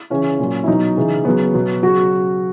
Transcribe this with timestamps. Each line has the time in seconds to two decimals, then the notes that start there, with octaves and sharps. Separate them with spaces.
0.10 C#3 E3 C#4
0.39 A#2 F#3
0.64 E4
0.68 B2 F#3 D#4
0.96 C#3 E3
1.25 C#3 F#3 B3
1.54 B2 F#3
1.83 C#3 F#3 F#4